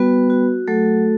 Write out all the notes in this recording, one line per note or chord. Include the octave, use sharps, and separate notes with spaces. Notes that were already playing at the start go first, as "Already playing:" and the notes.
Already playing: G3 B3 F#4 B4
F#4
F#3 A3 A4